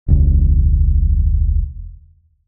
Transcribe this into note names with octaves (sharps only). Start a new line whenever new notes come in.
E1 C#2